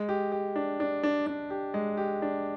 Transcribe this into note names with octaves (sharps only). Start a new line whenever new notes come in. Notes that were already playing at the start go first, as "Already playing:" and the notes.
Already playing: G#3
G4
G4
D4
D4
D4
D4
G4
G#3
G4
D4